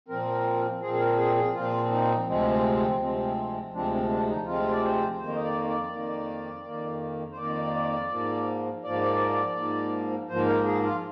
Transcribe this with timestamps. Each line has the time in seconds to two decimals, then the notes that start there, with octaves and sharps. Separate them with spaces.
0.08 A#2 F3 C4 A#4
0.82 A#2 F3 C4 G#4
0.93 G#4
1.00 A#4
1.18 G#4
1.36 G#4
1.54 A#2 F3 C4 F4
1.91 D#4
2.27 D2 C3 F3 G#3 C4
3.00 D2 C3 F3 G#3 C4
3.73 D2 C3 F3 G#3 C4 D4
3.92 C4
4.10 D4
4.27 D#4
4.46 D2 C3 F3 G#3 C4 F4
4.71 D5
4.82 C5
5.19 F2 D#3 A#3 C5
5.36 D#5
5.44 D5
5.68 D5
5.92 F2 D#3 A#3
6.65 F2 D#3 A#3
7.32 C5
7.37 F2 D#3 A#3 D5
8.11 G#2 F3 A#3
8.84 G#2 F3 A#3 D5
9.57 G#2 F3 A#3
10.29 G#2 F3 A#3 C5
10.47 A#4
10.65 G#4
10.83 F4